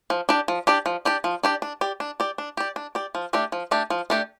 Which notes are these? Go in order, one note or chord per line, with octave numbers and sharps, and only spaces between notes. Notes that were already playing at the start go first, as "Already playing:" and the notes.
F3
D4 G4 D5
F3
D4 G4 D5
F3
D4 G4 D5
F3
D4 G4 D5
D4
G4 D5
D4
G4 D5
D4
G4 D5
D4
G4 D5
F3
A3 D4 G4 D5
F3
A3 D4 G4 D5
F3
A3 D4 G4 D5